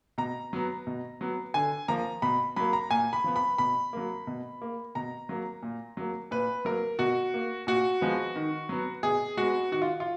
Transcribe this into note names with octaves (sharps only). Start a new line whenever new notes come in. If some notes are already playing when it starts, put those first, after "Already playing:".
B2 A#5
F#3 B3
B2
F#3 B3
D3 G#5
F3 A#3 A#5
B2 B5
F#3 A#3 B5
A#5
A#2 G#5
B5
F3 B3
B5
B2 B5
F#3 A#3
B2
A#3
B2 A#5
F#3 A#3
A#2
F#3 A#3
A#2 B4
F#3 A#3 A#4
B2 F#4
A#3
A#2 F#4
F3 G#3 B3
D#3
F#3 B3
B2 G#4
G#3 B3 F#4
D#3 F#4
F4
F4